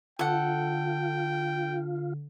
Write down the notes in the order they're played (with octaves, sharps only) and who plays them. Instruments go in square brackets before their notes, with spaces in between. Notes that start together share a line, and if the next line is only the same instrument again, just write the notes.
[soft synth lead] D3 [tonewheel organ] F4 [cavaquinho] A4 F#5 [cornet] G5